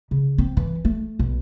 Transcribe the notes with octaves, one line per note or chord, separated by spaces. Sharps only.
C#3
C4
E3
A3
B1